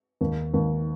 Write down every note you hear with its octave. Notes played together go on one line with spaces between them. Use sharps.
D#2
D#2